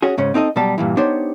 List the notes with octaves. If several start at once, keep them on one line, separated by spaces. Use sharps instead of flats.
C#4 F#4 G#4
G#2 C#3 C#4
C4 D#4 A4 B4 D#5
B2 F#3 G3 A5
G2 A#2 E3
B3 D4 D#4 G4 C5 C#5